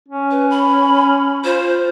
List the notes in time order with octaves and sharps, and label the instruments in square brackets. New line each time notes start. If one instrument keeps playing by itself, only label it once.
[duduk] C#4
[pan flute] B4
B5
[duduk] F4 [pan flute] C5